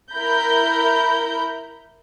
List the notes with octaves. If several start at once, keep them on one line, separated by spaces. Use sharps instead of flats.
E4 A#4 A#5 B5 G6